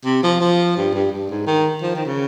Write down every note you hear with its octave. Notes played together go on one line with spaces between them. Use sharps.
C3
F3
F3
G2
G2
G2
G#2
D#3
F3
D#3
C#3